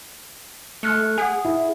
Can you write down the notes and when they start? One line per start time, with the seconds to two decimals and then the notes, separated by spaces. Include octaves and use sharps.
0.83 A3 F6 F#6 C#7
1.18 G#4 F#5 G#5
1.45 E4